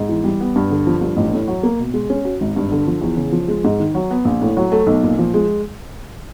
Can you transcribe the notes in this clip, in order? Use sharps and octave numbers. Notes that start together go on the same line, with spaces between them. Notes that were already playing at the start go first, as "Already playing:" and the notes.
Already playing: G#2
E3
G3
B3
G2
D3
F3
G2
A1
A2
F#3
A#3
B2
G#3
C#4
F#4
G#1
G2
D3
F3
E2
C#3
F3
G#3
G#2
D#3
F#3
B3
A#1
A2
F#3
A3
B1
A#2
F3
G#3